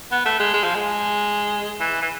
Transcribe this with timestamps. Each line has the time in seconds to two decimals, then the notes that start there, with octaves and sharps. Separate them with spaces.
0.11 B3
0.25 A3
0.39 G#3
0.53 G#3
0.64 F3
0.75 G#3
1.80 E3
2.02 E3